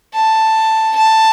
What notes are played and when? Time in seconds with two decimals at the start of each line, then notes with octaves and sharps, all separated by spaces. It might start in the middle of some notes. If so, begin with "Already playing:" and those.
0.15 A5
0.97 A5